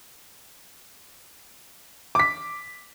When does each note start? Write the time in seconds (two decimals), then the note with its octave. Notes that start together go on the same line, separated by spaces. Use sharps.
2.15 D6 B6